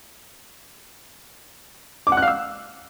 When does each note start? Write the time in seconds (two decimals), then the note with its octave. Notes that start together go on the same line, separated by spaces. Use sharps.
2.07 D6
2.12 F#5
2.17 F#6
2.22 F5
2.28 E6